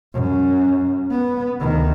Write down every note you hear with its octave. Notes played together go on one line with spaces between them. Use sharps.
F#2
B3
D2 D#3